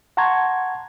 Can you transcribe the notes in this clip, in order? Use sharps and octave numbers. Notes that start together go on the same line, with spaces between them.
F#5 A5 A#5 C6 C#6 G#6